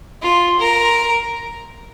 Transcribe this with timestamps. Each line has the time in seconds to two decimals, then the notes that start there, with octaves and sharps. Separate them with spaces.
0.22 F4
0.59 A#4